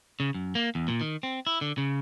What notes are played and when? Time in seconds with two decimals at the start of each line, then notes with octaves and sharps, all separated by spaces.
0.20 C#3
0.34 F#2
0.55 A#3
0.75 E2
0.88 A#2
1.01 D#3
1.23 C4
1.47 E4
1.61 D3
1.78 C#3